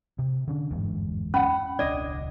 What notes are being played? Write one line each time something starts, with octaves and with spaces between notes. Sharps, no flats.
C3
D3 C#4 D4
G1 E2 G#2
C#4 F#5 B5
E1 C#2 C#4 D4 D5 D#5